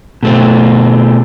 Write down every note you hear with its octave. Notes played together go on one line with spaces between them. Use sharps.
B2 A3 C4